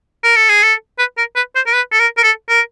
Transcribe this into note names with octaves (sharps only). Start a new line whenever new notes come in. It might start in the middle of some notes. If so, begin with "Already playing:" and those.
A#4
A4
G#4
A4
B4
A#4
B4
C5
A#4
B4
A4
A#4
A#4
A4
A#4